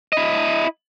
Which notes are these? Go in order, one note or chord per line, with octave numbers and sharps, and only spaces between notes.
E4 D#5